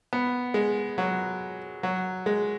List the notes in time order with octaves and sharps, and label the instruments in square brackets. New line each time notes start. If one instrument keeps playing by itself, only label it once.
[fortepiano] B3
G#3
F#3
F#3
G#3